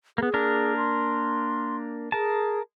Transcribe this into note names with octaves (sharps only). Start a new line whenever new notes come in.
A#3 B3 G#4
A#3 D4 A#4
C6
G#4 A#4 A5